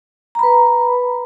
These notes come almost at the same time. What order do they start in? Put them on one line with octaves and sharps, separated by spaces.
A#5 B5 B4